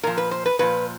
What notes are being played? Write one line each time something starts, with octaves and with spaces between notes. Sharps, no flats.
A#2 F3 A#4
B4
C5
B4
A#2 F3 B4